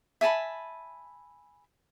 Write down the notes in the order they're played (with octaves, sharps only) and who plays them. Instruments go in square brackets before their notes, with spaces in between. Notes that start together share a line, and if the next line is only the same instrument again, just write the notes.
[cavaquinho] E5 G#5 A5 B5